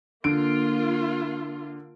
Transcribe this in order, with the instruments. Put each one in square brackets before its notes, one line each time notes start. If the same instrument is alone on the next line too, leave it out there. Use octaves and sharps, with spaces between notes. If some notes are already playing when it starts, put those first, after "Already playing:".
[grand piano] D3 D7 [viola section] A#3 F4